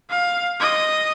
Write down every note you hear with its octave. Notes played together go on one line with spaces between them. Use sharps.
F5
D#5